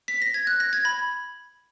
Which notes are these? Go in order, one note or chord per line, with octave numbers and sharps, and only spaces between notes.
B6
A#6
G#6
F#6
A#6
G#6
B5